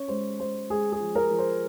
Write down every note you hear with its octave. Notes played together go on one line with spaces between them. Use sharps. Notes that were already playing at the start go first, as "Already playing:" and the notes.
Already playing: C#4 C#5
G#3 C5
G#3 C5
G#3 G#4
G#4
F3
A#4
F3
C5